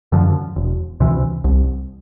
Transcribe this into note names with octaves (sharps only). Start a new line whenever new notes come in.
F#2 D3 F3
E1
D2 C3 E3
C2